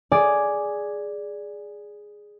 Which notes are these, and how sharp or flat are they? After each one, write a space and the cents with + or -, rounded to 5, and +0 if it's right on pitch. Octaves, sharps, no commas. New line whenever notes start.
G#4 +0 D5 +0